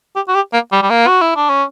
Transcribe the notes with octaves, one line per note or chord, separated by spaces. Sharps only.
G4
F#4
G4
A#3
G3
G3
A#3
F#4
E4
D4
C#4